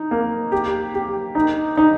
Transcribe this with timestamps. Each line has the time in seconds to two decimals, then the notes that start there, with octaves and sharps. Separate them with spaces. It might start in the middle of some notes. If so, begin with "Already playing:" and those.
Already playing: D#4
0.11 A#3
0.52 G4
0.94 G4
1.35 D#4
1.77 D#4